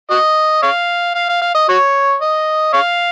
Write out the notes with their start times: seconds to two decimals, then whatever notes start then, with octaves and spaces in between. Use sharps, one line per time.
0.10 F#4 D#5
0.62 C#5 F5
1.15 F5
1.29 F5
1.41 F5
1.54 D#5
1.69 F#4 C#5
2.21 D#5
2.73 C#5 F5